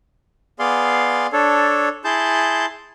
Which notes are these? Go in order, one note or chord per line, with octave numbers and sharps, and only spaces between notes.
B3 G#4 D5 F5 C6
D4 A4 C#5
E4 G#4 A5 C6 G6